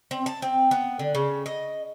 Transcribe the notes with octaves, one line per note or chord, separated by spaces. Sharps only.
C4
A5
C4
B3
D3
C#3
D#5